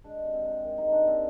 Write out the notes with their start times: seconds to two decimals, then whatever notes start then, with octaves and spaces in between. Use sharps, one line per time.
0.04 G#3 D4
0.24 C3
0.34 C4
0.44 C3
0.63 D#3
0.78 G#2 D#4
0.92 D4
1.01 G3
1.07 C4